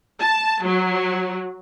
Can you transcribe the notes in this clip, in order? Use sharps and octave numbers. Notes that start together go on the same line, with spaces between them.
A5
F#3